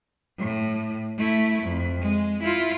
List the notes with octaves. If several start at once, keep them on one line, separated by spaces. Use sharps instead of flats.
A2
A3 E4
F2
G#3
E4 F4